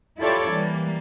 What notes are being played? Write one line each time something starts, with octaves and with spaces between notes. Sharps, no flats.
E4 F4 G4 A4 C#5 D5
E3 G3 A#3